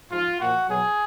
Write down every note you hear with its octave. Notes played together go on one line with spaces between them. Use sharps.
G#2 F3 F4
A#2 F3 F#4
B2 F#3 G#4